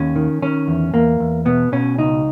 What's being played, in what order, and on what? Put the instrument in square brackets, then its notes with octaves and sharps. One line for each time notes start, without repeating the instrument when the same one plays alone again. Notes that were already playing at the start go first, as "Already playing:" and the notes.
Already playing: [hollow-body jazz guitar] D#2 C#4
D#3
D#3 C#4
E2
E2 A#3
E2
B2 B3
B2 C#4
C#2 D#4